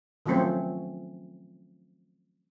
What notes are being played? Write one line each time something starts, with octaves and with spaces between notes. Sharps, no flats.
D#3 F3 F#3 A3 C4 C#4